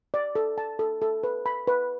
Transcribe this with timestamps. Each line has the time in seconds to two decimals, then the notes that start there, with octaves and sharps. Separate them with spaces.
0.14 D5
0.35 A4
0.58 A5
0.79 A4
1.02 A4
1.23 B4
1.46 B5
1.67 B4